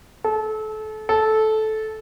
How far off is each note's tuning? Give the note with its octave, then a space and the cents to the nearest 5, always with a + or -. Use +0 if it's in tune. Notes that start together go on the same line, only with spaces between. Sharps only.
A4 -30
A4 -15